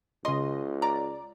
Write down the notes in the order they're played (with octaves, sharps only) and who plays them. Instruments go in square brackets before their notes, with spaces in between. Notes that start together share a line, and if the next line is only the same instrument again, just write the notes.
[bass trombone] C#2 [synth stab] C#3 D#5 [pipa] C6
[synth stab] D5 [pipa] A#5